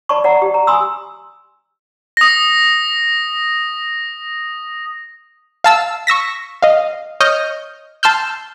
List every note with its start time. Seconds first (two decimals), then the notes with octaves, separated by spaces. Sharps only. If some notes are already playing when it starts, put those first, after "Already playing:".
0.09 D5 A5 B5 C#6
0.24 D5 F#5 A#5
0.42 G4
0.54 A#5
0.67 G#5 B5 C6 D#6 E6
2.17 D#6 A#6
5.64 F5 A5 E6
6.07 C#6 E6 A#6 B6
6.62 D#5 F5
7.20 C#5 D#5 F6 G6
8.03 A5 C6 E6 F6 G6